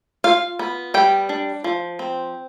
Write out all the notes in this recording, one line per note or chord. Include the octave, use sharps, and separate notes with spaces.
F4 F5
B3
G3 G5
D4
F3
C4